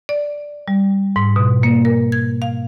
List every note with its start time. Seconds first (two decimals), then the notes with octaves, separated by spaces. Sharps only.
0.09 D5
0.68 G3
1.16 G#2
1.36 B2
1.63 A#3
1.85 A#4
2.12 G#6
2.42 F5